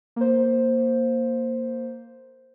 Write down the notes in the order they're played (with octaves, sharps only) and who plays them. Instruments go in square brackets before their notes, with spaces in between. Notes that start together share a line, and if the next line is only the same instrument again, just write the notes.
[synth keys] A#3 C5